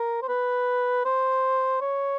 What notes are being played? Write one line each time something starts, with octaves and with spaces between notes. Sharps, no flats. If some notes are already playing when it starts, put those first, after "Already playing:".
Already playing: A#4
C5
B4
C5
C#5